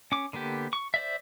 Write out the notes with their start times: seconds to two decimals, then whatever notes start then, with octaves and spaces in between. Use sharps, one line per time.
0.12 C#4 D6
0.33 D3 A#3 B3 G4
0.73 C#6
0.94 C5 D5 E5